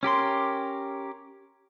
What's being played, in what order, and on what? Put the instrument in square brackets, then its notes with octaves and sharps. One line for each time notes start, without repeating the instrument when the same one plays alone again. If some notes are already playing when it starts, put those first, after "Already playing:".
[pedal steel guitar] C#4 G4 A#4 C6